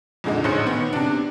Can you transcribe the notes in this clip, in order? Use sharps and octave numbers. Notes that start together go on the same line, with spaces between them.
F2 A#2 D3 G#3 D#4
A1 C#4 C5 C6 F#6 C#7
D#3 B3
C3 D4